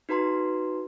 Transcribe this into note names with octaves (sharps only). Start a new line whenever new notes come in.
D#4 F#4 B4 A#5 C6